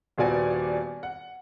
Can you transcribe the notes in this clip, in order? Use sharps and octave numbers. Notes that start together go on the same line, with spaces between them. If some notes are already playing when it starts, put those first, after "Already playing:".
D#1 A#2 B3 F#4 D5 G#5
F#5